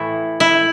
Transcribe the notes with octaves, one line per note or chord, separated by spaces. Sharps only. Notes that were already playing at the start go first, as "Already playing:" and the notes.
Already playing: A2 E3 A3 E4
E4